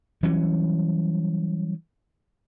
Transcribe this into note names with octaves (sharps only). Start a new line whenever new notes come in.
E3 F#3 G3 C#4